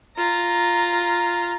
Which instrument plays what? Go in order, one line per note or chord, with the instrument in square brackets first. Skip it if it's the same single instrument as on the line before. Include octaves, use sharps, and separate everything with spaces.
[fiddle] F4 A#5